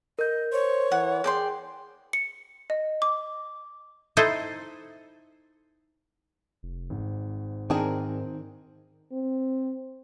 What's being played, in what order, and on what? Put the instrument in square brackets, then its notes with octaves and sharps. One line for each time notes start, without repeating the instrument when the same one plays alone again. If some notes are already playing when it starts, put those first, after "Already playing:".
[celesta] A#4 G6 [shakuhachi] D#5
[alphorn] C5 [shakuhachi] C#5
[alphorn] E3 [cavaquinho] F#5
[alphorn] G#4 [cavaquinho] D5 G5 C6
[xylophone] C#7
D#5
D6
[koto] D#4 E4 A4 C5 D#5
[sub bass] F1
[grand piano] G#1 [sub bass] G#2
[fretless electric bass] D#3 [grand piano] C4 G5 [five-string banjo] D4 G#4 A#4
[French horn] C4